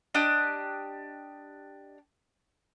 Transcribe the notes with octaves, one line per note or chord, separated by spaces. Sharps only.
D4 G4 D#5